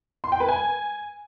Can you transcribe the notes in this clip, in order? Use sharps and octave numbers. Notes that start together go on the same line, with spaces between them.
C6
G5
B4
G#5